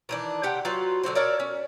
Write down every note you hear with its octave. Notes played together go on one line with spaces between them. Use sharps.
D#3 E3 D4
C3 G4 F#5 G5
F#3 F4 B4
D3 F#3 F#4 C5
A#4 C#5 D5 E5
C#4